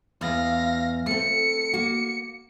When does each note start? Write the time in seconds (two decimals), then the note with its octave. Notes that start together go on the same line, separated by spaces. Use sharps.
0.21 E2 F5 A#6
1.06 A3 C4 C#7
1.73 A#3 F#4